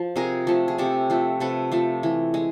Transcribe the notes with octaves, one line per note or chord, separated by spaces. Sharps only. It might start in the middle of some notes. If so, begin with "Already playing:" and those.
Already playing: F3
C3 G#4 A#4
F3 A3
G#4
C3 G4 A4
F3 A3
C3 A4 B4
F3 A3
E3
G#3